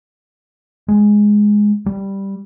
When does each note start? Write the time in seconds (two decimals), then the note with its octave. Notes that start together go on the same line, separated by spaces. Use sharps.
0.88 G#3
1.86 G3